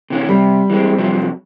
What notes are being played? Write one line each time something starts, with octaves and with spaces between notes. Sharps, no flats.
C3 E3 C#4
C3 G3
E3 G#3 C4
C3 F3 F#3